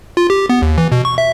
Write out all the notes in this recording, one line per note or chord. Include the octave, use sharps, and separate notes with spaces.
F4
G4
B3
D#2
E3
B2
C#6
E5